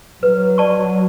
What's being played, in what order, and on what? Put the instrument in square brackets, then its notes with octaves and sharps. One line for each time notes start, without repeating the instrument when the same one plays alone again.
[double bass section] F#3 [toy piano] B4
[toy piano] D5 A5 C#6